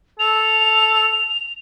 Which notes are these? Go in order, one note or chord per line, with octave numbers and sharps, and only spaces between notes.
A4 F7